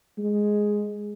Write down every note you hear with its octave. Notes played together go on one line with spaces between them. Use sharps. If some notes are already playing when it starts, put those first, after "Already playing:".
G#3